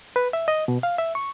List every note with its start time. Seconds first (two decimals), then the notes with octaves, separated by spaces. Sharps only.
0.16 B4
0.33 E5
0.48 D#5
0.68 B2
0.83 F5
0.98 E5
1.15 C#6